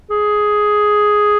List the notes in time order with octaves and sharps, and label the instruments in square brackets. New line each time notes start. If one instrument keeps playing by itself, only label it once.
[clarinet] G#4